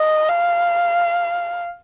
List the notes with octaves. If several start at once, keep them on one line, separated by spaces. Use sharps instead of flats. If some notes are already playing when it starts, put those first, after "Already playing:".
Already playing: D#5
F5